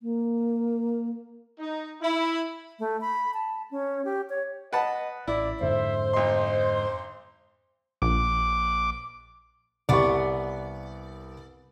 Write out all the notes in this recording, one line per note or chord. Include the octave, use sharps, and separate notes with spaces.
A#3
D#4
E4
A3
B5
A5
C#4
G4
C#5
B4 D#5 F#5 A5
A1 E4 D5
F2 G#2 D3 C5 E5
B1 D#5 C6
A#1 D6
C2 B3 G4 D5 C#6